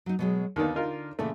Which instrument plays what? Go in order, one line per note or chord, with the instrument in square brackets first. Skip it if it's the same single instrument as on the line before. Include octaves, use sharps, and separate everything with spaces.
[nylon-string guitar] F#3 D#4
B2 F#3 G#3
[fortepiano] D#2 D#3 B3 [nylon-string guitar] D3 D5
[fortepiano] D#4 F4 A#4
[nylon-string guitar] A#2 C#3 E3 [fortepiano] A3